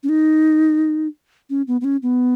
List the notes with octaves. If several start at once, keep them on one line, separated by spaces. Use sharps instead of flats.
C#4
D#4
C#4
B3
B3
C#4
B3